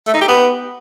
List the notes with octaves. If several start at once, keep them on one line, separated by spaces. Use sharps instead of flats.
A3
D#4
G4
B3